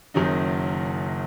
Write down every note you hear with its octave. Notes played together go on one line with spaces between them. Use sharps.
F#1 F#2 D#3 F#3 D#4